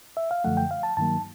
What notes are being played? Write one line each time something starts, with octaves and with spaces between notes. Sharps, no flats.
E5
F5
F#2 D3 F3 A3 F#5
G5
F5
A5
G2 D#3 F#3 A#3 A5